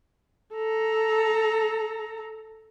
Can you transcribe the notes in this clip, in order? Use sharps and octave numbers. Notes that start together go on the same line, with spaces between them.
A4 A#5